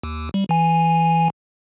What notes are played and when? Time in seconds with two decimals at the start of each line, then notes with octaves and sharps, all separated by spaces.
0.03 D#2
0.34 G3
0.49 E3 G#5